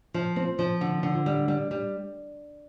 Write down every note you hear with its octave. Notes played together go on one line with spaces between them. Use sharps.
F3
C4
F3
D3
D3
G3
G3
G3